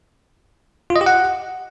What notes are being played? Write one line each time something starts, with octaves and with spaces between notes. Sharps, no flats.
F4
D#5
G4
F#5